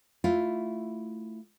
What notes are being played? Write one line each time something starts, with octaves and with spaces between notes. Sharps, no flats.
A3 E4 F4